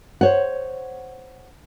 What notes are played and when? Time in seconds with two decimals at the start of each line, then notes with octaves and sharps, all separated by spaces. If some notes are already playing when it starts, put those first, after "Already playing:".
0.21 C5 C#5 F#5